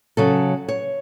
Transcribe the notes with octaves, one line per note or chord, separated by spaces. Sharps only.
C#3 F#3 A4
C#5